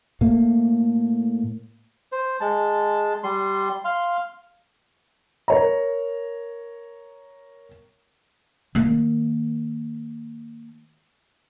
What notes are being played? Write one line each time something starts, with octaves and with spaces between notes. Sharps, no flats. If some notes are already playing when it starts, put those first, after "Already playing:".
A2 A#3
C5
G#3 A5
G3 C6
F5 C6
A#4 C#5 A#5
D#3 A#3